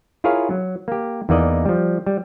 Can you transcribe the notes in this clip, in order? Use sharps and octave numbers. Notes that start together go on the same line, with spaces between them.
E4 F4 G#4 A#4 C#5 F5
F#3
A#3 G4
E2 E3 A#3 D#4 D5 D#5
F3 G3
G3